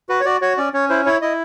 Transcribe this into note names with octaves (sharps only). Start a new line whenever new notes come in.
F#4 B4
C#5
F#4 D5
F#4 C#5
C#4 D5
C#4 C#5
E4 C5
E4 C#5
E4 D#5